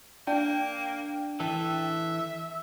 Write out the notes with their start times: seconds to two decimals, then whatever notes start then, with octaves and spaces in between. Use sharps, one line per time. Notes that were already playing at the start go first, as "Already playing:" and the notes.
0.27 A#3 D4 G5
1.40 E3 A4 E5